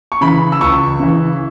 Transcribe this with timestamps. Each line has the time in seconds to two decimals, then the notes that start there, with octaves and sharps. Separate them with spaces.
0.12 C#6
0.21 C#3 E3 B5
0.52 E6
0.61 C#2 C#6
1.00 C#3 E3